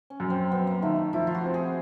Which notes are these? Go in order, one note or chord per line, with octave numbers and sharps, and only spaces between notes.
C#4
F#2
C4
F#2 B3
A#3
D#3 A3
F3 E4
F4
F#4
C4
G#4